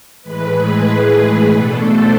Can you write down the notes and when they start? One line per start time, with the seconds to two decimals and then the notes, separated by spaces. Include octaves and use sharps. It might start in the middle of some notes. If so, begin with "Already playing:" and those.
0.22 A2 E3 G#3 B4
0.55 G#4
1.49 B2 A3 D4 A4
1.81 C5